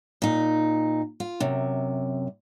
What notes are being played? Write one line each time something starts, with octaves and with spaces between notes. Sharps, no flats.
A#2 D#4
F4
F#2 C3